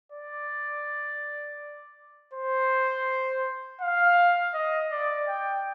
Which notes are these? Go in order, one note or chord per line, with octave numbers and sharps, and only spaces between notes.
D5
C5
F5
D#5
D5
G5